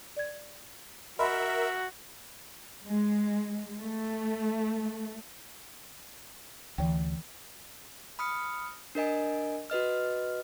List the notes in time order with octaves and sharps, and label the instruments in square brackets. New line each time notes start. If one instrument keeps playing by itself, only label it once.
[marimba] D5 G#6
[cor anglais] F#4 [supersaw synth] A#4 E5 [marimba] D#5 B5 C6
[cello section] G#3
A3
[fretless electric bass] D2 [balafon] E3 G5
[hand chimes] B5 D#6 F6 C#7
D4 A#4 D#5 G#5
F#4 B4 D#5 F6